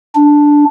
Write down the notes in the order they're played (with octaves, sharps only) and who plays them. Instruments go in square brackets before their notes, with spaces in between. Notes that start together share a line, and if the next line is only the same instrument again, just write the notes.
[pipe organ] D4